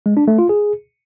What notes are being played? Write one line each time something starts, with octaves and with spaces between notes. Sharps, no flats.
G#3
D4
A3
F4
G#4